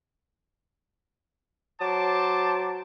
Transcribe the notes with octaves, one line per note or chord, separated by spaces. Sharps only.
F#3 C5 A5 D6